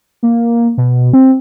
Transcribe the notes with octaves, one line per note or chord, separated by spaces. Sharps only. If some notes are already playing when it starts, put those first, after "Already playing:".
A#3
B2
C4